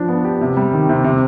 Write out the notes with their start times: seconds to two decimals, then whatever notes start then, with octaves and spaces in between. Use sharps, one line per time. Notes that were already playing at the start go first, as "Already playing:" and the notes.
Already playing: F3 D4
0.09 B3
0.25 G4
0.41 C3
0.57 G3
0.73 D#3
0.89 C3
1.04 C3